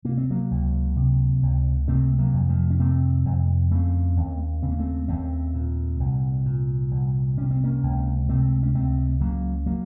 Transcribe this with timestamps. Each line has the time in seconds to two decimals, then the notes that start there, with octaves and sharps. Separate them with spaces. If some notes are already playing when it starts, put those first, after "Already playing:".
0.05 C3 A#3
0.18 C4
0.30 F#3 A#3
0.51 C#2
0.96 C3
1.43 C#2
1.88 C3 A3 C4
2.18 F#3 A#3
2.33 F2
2.49 F3 A3
2.71 C#4
2.79 C3 A3 C4
3.25 F2
3.71 C#3 A3 C4
4.17 D#2
4.62 C#3 C4
4.71 A#3
4.79 A3 C4
5.08 D#2 A3 C4
5.54 A#2
6.00 C2
6.46 A#2
6.91 C2
7.38 C3 C#4
7.51 C4
7.64 A#3 C#4
7.83 C#2
8.29 C3 A3 C4
8.63 C#4
8.74 C#2 A3 C4
9.20 C#3 F#3 A#3
9.66 F#3 A#3